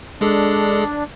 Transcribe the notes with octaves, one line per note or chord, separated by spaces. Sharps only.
G#3 D4 G#4 A4